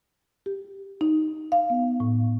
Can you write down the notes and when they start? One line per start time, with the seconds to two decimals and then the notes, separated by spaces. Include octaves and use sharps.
0.46 G4
1.01 D#4
1.52 F5
1.70 B3
2.00 A2